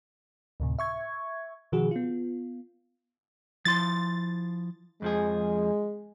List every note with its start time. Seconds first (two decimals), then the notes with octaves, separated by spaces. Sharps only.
0.60 D2 A2 C3
0.79 E5 C#6 G#6
1.72 B2 D#3 F3 F#4 G#4
1.91 B3 F4
3.65 F3 E4 C6 A6
5.02 F2 F3 G#3 G#4